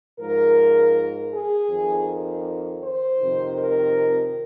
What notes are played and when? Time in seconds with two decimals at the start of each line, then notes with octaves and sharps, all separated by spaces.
0.18 G#2 F3 A#4
1.31 G#4
1.68 F2 D#3
2.80 C5
3.18 F2 C3 D#3
3.56 A#4